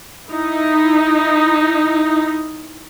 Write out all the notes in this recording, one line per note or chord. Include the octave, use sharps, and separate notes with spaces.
D#4 E4